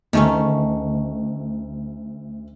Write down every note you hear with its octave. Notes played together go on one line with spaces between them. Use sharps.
D2 D#3 A3 C#4